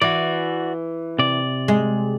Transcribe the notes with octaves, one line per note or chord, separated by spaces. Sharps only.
E3 F#4 D5
C3 D5
G#3